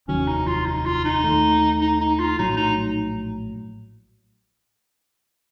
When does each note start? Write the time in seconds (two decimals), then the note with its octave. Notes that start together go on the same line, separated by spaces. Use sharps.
0.08 F1 D#2 D#3 F#3 C#4
0.27 D#4
0.47 F4
0.66 D#4
0.85 F4
1.04 D#4
1.24 D#2 D#3 A3
1.81 D#4
2.00 D#4
2.19 F4
2.38 A#1 A2 F#3 D#4
2.57 D#4